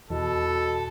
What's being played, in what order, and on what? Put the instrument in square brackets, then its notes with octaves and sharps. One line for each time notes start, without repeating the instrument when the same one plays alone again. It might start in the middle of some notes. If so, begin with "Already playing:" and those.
[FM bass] E2 [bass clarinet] B2 [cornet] A4